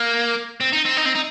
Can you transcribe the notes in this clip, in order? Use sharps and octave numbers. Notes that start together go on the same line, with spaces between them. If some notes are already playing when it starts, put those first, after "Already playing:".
Already playing: A#3
C4
D#4
C4
D#4
C4
D#4